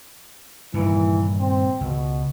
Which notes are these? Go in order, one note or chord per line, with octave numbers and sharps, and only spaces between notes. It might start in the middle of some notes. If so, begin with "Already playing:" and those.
G2 A#2 D#3 E3
C4
C#2 B2